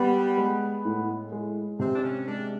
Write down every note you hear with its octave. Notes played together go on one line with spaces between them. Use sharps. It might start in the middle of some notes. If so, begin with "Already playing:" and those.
Already playing: G3 B3
G#3
A2
G#3
C3 C4
D4
C#4
G#3 D4